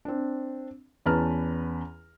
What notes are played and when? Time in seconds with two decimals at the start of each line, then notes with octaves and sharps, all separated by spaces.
0.05 C4 D4
1.06 E2 C#4 B4 A5 A#5 F6